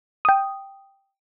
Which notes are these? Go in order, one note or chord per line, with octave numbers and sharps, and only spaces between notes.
G5 D#6